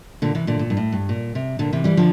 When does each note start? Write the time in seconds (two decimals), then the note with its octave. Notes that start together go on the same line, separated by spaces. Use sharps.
0.22 A#2 D3
0.35 C3 E3
0.47 A#2 D3
0.59 A#2
0.70 G2
0.77 A2
0.92 G2
1.09 A#2
1.35 C3
1.59 A#2 D3
1.73 C3 E3
1.84 E3 G3
1.97 D3 F3